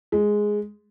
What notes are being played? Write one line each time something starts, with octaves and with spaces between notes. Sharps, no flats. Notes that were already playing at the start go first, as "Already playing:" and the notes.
G#3